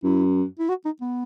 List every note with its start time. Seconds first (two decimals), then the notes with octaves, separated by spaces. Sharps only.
0.04 F#2 E4
0.59 E4
0.69 F#4
0.85 D#4
1.01 B3